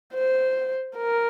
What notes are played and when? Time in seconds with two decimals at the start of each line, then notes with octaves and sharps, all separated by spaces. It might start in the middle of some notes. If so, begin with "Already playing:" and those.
0.15 C5
0.97 A#4